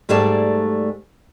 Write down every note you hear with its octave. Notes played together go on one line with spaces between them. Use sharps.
G#2 G3 A3 G#4 D5 A5